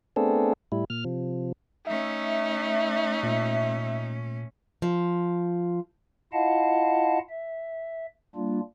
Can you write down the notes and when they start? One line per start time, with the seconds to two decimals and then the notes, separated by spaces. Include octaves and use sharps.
0.16 A3 B3 C4 D4 G#4 A4
0.72 A2 G3 E4
0.90 A#2 F6
1.05 C3 F3
1.87 A3 C#4 D#4 E5
3.23 A#2
4.82 F3
6.33 E4 F4 D#5 F5 F#5 A5
7.29 E5
8.36 G3 A#3 D4 F4